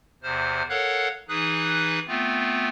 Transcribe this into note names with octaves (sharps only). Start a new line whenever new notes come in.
E2 C3 C5 F6
A4 A#4 C#5 F5 F#5 F#6
E3 D#4 G#4 B4 D#6 F#6
A3 B3 C4 F4